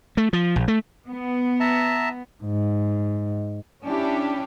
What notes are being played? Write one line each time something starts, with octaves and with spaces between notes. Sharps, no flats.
A3
F3
A#1
A3
B3
E5 A5 A#5
G#2
C#4 D4 E4 G4